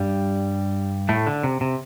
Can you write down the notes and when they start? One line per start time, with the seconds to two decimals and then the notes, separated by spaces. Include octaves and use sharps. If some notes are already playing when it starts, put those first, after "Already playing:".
Already playing: G2 G3
1.09 A2 A3
1.27 D3
1.43 C3
1.61 C3